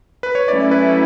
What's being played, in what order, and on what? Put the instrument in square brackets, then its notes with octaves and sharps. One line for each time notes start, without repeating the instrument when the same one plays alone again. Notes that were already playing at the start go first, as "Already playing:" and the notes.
[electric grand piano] B4
C#5
[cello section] F#3 A3 C#4 E4 [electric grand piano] D5
[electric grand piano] B4